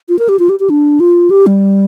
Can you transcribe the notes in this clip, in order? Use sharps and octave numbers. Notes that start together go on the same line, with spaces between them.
F4
A#4
G4
F4
G4
G4
D4
F4
G4
G3